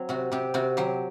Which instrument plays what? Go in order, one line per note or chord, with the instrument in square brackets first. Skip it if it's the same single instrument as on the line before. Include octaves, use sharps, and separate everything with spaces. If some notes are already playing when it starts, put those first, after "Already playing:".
Already playing: [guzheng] F#3 C4
C3 F#4
C3 G4
C3 F#4
F#3 G4